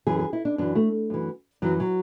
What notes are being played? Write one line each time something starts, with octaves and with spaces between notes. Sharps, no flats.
F#2 E3 G#4
G#4
E4
D4
F#2 E3 D4
A3
F#2 E3
F#2 E3 F#3
F#3